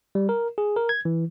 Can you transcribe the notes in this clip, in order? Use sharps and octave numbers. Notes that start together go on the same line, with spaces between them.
G3
A#4
G#4
A#4
G#6
E3